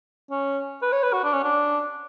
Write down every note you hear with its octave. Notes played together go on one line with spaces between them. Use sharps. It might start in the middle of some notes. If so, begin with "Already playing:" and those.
C#4
B4
C#5
B4
F#4
D4
C#4
D4